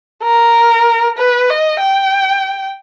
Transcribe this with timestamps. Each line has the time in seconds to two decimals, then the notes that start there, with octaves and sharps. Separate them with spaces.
0.23 A#4
1.18 B4
1.49 D#5
1.80 G5